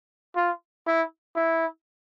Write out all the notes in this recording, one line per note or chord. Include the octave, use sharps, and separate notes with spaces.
F4
E4
E4